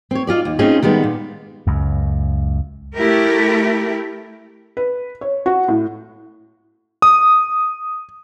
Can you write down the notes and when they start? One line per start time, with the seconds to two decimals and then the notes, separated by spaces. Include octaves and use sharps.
0.11 C4 C#5
0.27 D#4 F4 G4 D5
0.45 D#2
0.59 A3 C4 C#4 D#4 F4 G#4
0.83 D#3 G3 G#3 B3
1.04 A#2
1.67 C#2 F#2
2.95 A3 E4 G4 A#4
4.77 B4
5.21 C#5
5.46 F#4
5.68 A2
7.02 D#6